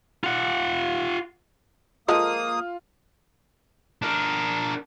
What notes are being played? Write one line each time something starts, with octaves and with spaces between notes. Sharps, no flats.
F4 F#5
F3 G#3 A#3 F4 A4 D#6
D4 A#4